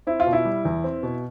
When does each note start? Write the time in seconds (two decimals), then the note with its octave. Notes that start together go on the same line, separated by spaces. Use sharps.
0.07 C4 E4
0.20 F4
0.27 B2
0.33 E4
0.45 G3
0.65 E2
0.84 C4
1.03 B2